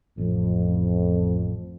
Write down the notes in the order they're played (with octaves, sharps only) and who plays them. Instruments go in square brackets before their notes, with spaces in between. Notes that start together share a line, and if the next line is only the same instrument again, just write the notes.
[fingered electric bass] A1 F3 [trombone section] F2